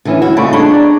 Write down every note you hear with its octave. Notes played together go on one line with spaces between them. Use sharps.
D2 D3 E3 C#4
E4 F#4
A#2 C#3 A3 D#4 D5 B5 C#6
D4 D#4 G#4 A5 B5 C#6
D5 A#5 B5